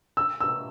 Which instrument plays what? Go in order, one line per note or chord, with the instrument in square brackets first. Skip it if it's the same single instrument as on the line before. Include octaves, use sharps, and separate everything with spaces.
[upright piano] E6
E6